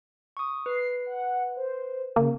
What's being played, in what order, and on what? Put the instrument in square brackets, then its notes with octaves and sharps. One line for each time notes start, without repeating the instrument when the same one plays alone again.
[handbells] C#6 D#6
[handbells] B4 [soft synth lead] C7
[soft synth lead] F#5
C5
[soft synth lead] C#3 [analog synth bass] A#3